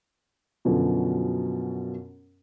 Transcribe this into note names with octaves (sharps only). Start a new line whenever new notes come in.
F#2 B2 D3 F3 C#4